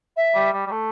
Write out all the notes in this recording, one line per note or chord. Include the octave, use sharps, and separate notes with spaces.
E5
G3
G3
G3
A3